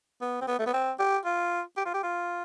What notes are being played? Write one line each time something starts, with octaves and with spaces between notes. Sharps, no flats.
B3
C4
B3
A3
B3
C4
G4
F4
G4
F4
G4
F4